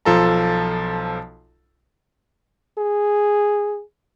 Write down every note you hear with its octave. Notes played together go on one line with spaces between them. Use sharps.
B1 F3 F4 A4 A5 A#5
G#4